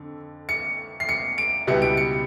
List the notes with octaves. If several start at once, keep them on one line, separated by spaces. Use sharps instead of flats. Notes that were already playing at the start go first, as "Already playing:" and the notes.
Already playing: F2 D3
C#7
C7
C#7
D7
C#2 B2 G3 B3 E4 C#7
D7
C#7